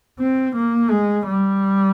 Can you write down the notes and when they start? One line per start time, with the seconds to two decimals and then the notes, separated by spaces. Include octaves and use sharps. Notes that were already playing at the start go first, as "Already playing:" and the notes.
0.19 C4
0.55 A#3
0.90 G#3
1.26 G3